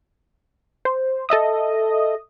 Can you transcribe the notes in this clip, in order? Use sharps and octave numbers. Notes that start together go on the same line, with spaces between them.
C5
A4 D#5 E5 D#6